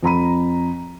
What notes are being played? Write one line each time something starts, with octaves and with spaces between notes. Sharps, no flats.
F2 A#5 B5 D#7